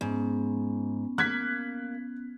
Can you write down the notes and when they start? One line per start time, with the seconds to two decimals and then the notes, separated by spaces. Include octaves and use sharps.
0.01 G#2 B3 C#4
1.18 A#3 F#6 G#6 B6